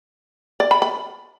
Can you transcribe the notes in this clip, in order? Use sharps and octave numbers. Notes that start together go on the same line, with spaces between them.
D5
B5
B5